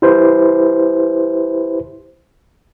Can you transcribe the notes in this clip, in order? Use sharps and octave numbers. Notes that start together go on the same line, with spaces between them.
E4 G4 B4 C5